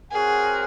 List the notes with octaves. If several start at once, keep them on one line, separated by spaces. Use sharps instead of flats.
C4 F#4 G#4 A#4 C#5 F#5